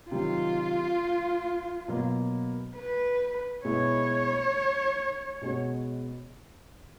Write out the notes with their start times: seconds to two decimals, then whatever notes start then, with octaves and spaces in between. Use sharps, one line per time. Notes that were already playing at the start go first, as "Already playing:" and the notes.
0.11 C3 D#3 F#3 F4
1.88 B2 F#3 A#3
2.76 B4
3.64 B2 G#3 B3 E4 C#5
5.41 B2 G#3 C#4 F#4